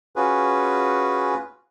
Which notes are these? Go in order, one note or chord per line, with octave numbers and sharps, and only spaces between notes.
C#4 F4 F#4 G#4 B4